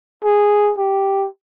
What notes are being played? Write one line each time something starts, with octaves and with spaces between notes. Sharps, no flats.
G#4
G4